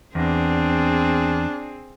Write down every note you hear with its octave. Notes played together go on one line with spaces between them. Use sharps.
E2 C4 D4 G#4